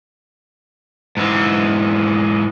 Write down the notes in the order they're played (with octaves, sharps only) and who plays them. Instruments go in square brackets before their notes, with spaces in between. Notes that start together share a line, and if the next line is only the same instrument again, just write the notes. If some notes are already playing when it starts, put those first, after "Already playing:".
[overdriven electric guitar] G#2 E3